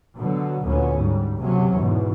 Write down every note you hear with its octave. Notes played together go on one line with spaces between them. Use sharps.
B2 D3 F#3
D2 A#2 B3 C#4
G#2 G3
F#1 C3 F#3 C#4
E2 G#2 B2